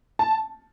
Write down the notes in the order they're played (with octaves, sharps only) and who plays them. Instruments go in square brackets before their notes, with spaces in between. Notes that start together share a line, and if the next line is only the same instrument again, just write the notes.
[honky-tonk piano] A5